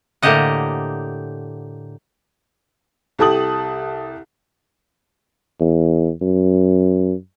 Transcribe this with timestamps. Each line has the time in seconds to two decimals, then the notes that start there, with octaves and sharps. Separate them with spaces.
0.22 A2 D3 A#3 G4 D#5 F#5
3.19 C2 G4 A4 A5 D#6 F#7
5.60 E2
6.22 F#2